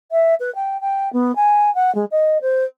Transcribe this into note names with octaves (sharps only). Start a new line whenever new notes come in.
E5
B4
G5
G5
B3
G#5
F#5
G#3
D#5
C5